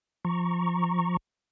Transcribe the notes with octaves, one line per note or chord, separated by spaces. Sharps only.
F3 A#5 C#6